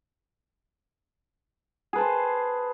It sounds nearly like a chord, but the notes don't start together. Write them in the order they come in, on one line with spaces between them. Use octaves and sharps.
G#4 B4 A5 C5